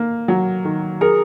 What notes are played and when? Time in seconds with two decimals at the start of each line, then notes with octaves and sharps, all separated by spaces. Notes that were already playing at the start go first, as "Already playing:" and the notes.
Already playing: A#3
0.28 F#3
0.65 D#3
1.01 G#4 A#4